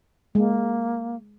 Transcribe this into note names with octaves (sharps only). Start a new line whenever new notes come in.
G#3 A#3